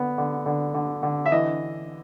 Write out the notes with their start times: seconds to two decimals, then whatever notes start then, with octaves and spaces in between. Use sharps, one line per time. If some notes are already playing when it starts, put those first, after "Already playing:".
Already playing: D3 B3
0.18 D3
0.46 D3
0.74 D3
1.03 D3
1.26 E5
1.32 E3 D#5